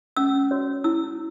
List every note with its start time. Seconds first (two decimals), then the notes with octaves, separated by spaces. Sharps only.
0.17 C#4 E6
0.51 F#4 C#5
0.84 E4 E6